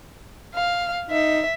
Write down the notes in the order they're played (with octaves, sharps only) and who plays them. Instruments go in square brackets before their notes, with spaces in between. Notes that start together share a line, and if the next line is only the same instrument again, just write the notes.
[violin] F5
[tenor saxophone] D#4 [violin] E5